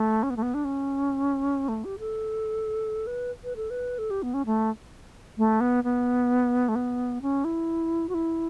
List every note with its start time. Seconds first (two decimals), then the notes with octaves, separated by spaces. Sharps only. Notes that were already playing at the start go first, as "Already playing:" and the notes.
Already playing: A3
0.23 C#4
0.30 B3
0.37 A3
0.42 B3
0.54 D4
0.65 C#4
1.68 A3
1.85 G4
1.99 A4
3.07 B4
3.44 B4
3.56 A4
3.70 B4
3.99 A4
4.10 G4
4.23 B3
4.34 C#4
4.46 A3
5.38 A3
5.61 B3
5.84 B3
6.69 A3
6.75 B3
7.22 C#4
7.45 E4
8.09 F#4
8.14 E4